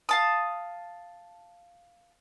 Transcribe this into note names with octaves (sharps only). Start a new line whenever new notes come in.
F5 A5 D#6